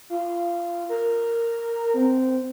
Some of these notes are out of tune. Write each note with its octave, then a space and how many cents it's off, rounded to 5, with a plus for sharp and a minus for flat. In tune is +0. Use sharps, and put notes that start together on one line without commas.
F4 -20
A#4 -10
C4 -15